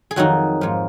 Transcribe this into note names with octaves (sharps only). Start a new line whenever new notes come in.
G#4
F2 D#3 F#3 D#4 F#4
G#2 F3